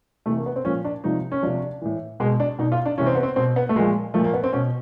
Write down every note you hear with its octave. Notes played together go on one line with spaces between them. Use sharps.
C3 E3 A3
A#3
B3
C4
A#2 F3 C#4
D4
C3 F3 D#4
C#4
C3 F3 D4
A2 E3
B2 G#3
D4
B2 D#4
F4
D4
C3 E3 C#4
C4
B3
C4
B2 C4
B3
A3
A#2 F3 G#3
A#2 F3 A3
A#3
B3
C4
B2 C#4